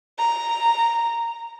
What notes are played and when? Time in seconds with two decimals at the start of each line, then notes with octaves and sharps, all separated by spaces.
0.19 A#5